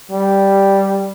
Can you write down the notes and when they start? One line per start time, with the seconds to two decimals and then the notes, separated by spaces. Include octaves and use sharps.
0.11 G3